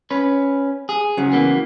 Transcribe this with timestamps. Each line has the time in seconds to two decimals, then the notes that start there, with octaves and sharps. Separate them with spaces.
0.10 C#4 B4
0.89 G#4
1.17 C#3 F#3
1.32 E3 A#3 B3